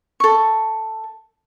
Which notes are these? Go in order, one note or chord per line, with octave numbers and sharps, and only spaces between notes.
A4 C#6